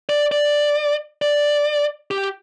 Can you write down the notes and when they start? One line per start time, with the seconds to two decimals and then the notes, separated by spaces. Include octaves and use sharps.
0.09 D5
0.32 D5
1.22 D5
2.11 G4